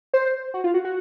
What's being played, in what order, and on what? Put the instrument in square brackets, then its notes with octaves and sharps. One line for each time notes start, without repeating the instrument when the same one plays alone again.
[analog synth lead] C5
F#4
F4
F#4
F#4